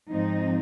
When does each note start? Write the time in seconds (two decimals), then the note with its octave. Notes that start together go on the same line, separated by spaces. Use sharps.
0.12 G#2 F3 C4 D#4